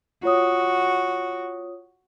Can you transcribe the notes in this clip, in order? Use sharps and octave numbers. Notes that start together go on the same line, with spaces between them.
F4 F#4 C#5 D#6